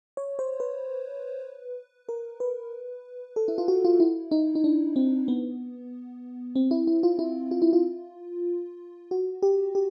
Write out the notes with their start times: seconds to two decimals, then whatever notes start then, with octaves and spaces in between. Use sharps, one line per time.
0.17 C#5
0.39 C5
0.60 B4
2.09 A#4
2.40 B4
3.36 A4
3.48 E4
3.58 F4
3.68 F#4
3.85 F4
4.00 E4
4.31 D#4
4.55 D#4
4.64 D4
4.96 C4
5.28 B3
6.56 C4
6.71 E4
6.87 E4
7.03 F4
7.19 E4
7.51 F4
7.62 E4
7.73 F4
9.11 F#4
9.42 G4
9.75 G4